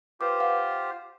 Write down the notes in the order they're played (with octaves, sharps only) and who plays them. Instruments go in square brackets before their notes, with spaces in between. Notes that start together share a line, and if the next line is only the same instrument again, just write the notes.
[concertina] F4 G4 C5 [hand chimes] B4 D6
[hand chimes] F5 F#5